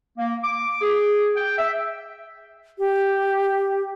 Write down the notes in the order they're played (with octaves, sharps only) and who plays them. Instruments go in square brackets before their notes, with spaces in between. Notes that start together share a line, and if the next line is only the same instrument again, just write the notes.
[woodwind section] A#3
D6
G#4
G5
E5
[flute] G4